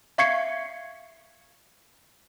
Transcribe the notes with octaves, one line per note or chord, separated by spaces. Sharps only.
E5 F5 C#6 G#6 C7 C#7